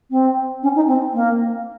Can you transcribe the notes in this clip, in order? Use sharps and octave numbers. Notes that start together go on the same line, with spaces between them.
C4
C#4
D#4
C4
A#3